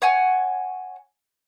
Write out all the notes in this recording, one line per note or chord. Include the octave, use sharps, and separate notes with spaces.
C#5 F#5 G#5